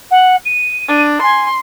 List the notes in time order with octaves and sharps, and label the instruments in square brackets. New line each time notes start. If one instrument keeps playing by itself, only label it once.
[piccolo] F#5
D#7
[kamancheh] D4
[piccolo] G#5 [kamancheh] C6